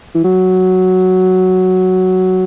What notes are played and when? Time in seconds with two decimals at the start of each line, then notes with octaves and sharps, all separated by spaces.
0.15 E3
0.24 F#3